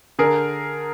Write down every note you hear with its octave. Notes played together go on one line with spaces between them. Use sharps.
D3 G#4 A#4